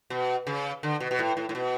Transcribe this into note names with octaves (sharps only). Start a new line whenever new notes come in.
B2
C#3
D3
B2
B2
A2
A2
A2
B2